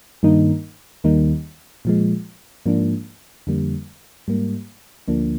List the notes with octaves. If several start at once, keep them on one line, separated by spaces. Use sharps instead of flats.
G2 D#3 A#3 D#4
D#2 D#3 G3 A#3 D#4
A#2 F3 G#3
G#2 F3 A#3 D4
F2 D3 G3 A#3
G#2 G3 A#3
D2 D3 F3 A#3 D4